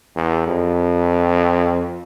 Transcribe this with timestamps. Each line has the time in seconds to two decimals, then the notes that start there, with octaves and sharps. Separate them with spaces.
0.16 E2
0.47 F2